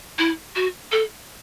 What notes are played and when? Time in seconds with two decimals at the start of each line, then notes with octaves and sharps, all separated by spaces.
0.18 E4
0.56 F#4
0.92 A4